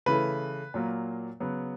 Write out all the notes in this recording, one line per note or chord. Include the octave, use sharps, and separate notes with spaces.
C#3 E3 A3 B4
A#2 F#3 A#3
C#3 F#3 B3